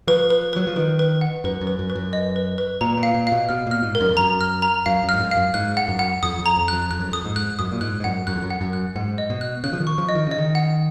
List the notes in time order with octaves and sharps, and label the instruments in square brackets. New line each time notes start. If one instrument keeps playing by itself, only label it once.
[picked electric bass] F3 [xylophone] B4
[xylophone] B4
[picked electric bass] F#3 [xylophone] B4
[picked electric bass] F3
[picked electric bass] D#3 [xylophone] B4
[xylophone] B4
F#5
[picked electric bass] F#2 [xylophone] B4
[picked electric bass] F#2
[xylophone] B4
[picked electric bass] F#2
[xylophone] B4
[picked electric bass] F#2
[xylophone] D#5
B4
B4
[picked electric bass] A#2 [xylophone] A#5
[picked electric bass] A#2
[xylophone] F5
[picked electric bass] A#2
[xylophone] F5
[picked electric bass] B2
[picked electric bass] B2 [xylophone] F6
[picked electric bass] A#2 [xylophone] F6
[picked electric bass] G#2
[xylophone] A#4
[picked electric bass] F#2
F2
[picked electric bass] F#2 [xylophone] A#5
[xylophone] F6
A#5
[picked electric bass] F#2 [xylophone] F5
[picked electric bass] F#2
[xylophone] F6
[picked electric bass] G#2
F#2
[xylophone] F5
[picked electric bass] F#2
[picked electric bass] G#2 [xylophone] F#6
[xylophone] F#5
[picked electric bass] F#2
[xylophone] F#5
[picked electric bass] F2 [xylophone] D#6
[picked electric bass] F2
[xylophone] A#5
[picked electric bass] F2
[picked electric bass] F2 [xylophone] F#6
[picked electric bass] F2 [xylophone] F#6
[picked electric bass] F#2
[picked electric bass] F2 [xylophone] D#6
[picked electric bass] G#2
[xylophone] F#6
[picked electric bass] F#2 [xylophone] D#6
[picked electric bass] A#2
[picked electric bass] G#2 [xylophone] F#6
[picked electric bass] G#2
[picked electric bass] F#2 [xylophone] F#5
[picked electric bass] F#2 [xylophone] F#6
[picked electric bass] F2
F#2
[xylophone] F#5
[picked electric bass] F#2
[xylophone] F#6
[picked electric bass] G#2 [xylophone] F#5
[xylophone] D#5
[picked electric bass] B2
[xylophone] F#6
[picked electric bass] C#3 [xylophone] F#6
[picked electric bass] F3
D#3
[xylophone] C#6
[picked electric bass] F3
[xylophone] D#5
[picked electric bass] D#3
[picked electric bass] C#3 [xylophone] D#5
[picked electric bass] D#3
[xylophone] F#5